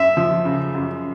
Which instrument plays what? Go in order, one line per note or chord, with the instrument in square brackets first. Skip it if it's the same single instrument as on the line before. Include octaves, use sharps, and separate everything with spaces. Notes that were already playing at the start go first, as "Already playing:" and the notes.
Already playing: [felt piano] F#2 C#3 [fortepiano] E5
[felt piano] F3
C#3
F#2